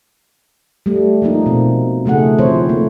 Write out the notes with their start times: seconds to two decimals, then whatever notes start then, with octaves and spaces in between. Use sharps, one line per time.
0.86 G3 A3
1.22 F3 A3 A#3 D#4
1.46 B2 C4
2.05 C#3 F3 A3 D#4 G#4 F#5
2.38 D#3 F3 C4 E4 C5 C#5
2.69 A3 A#3